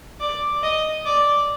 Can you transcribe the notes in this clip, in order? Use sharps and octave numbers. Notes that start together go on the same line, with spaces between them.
D5
D#5
D5